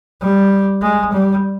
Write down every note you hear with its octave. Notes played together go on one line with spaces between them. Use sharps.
G3
G#3
G3